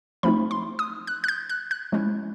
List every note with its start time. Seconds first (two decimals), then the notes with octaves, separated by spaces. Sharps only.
0.23 F3 A3 C4 D#4 B5
0.51 C6
0.79 D#6
1.07 F#6
1.24 F#6
1.28 G6
1.49 F#6
1.71 F#6
1.92 F3 G#3 C#4 E4